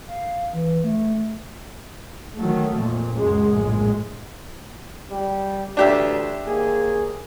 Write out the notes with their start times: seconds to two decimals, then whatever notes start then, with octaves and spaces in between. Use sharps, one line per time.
0.08 F5
0.53 E3
0.84 A3
2.37 D#3 F#3 A3
2.75 F2 A#2
3.13 C#2 F#2 G#3
3.52 A#1 F#2 A2 G#3
5.10 G3 G4
5.77 A1 D2 D4 G4 E5
6.45 D#2 A#3 G#4